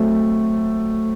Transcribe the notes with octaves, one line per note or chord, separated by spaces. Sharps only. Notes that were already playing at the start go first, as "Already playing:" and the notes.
Already playing: F#3 A3 C4